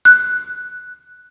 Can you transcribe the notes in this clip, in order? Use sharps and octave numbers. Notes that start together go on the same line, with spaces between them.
F#6